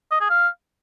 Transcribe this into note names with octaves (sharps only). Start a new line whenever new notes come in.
D#5
G#4
F5